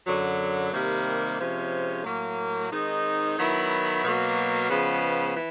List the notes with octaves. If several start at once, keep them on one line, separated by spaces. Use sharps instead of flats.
F#2 D3 F#3
C3 D#3 G3 A#3
C3 F3 G#3 C#4
A2 F#3 A#3
D#3 G#3 C4 D#4
D#3 F#3 B3 E4
B2 F#3 A#3
C#3 F3 G#3 B3
E3